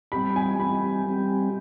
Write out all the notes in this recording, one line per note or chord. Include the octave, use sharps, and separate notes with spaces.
G3 C4 G4 B5
G#5
G3 C4 G4 B5
G3 C4 G4